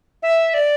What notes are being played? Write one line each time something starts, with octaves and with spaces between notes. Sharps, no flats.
E5
D5